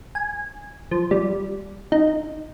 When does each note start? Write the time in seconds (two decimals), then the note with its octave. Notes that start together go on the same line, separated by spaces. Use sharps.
0.15 G#5
0.91 F3
1.11 G3
1.92 D#4